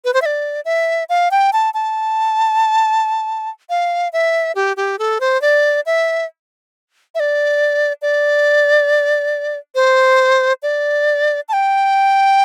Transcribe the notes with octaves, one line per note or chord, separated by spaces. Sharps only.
B4
C5
E5
D5
E5
F5
G5
A5
A5
F5
E5
G4
G4
A4
C5
D5
E5
E5
D5
D5
C5
D5
A5
G5